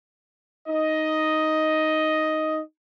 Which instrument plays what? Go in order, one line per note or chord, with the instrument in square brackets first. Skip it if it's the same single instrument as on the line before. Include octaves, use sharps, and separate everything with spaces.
[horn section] D#4 D#5